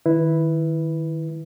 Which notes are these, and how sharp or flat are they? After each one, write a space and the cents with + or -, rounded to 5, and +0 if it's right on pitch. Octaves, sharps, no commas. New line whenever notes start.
D#3 +0 E4 +0 B4 +0